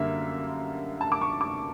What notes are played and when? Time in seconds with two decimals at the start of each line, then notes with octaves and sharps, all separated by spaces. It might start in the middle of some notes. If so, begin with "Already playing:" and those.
Already playing: F#2 D3 G3 A#3 E5
1.01 A5
1.12 D6
1.21 C#6
1.41 D6